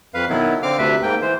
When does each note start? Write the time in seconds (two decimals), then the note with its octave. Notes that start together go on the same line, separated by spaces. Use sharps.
0.14 F2 B4 F5
0.29 B2 D#3 F#3 B3 E4
0.63 D3 C4 F5 D6 F6
0.78 D2 C3 A3 B4 E5
1.03 G#2 A#3 G5
1.22 E3 C5